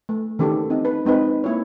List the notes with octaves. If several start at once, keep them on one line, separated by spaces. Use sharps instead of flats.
A3
D#3 E3 C#4 G4 A4
C4 D#4
B4
G#3 C4 D#4 B4
A#3 E4 C#5